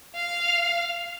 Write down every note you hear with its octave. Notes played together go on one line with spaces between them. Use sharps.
F5